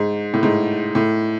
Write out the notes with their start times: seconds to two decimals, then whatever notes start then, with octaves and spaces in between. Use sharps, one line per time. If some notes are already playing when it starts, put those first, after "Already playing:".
Already playing: G#2
0.34 A2
0.43 G#2
0.95 A2